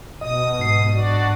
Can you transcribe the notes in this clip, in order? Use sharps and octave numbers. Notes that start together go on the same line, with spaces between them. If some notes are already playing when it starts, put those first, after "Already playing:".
B2 D#5 D#6
G#2 C7
D4 F#4 D5